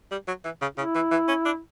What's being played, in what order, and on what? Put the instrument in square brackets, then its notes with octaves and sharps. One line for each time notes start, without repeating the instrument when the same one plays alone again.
[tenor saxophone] G3
F#3
E3
C#3
[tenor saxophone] C#3 [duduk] E4
[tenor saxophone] E3
E3
C#4
D4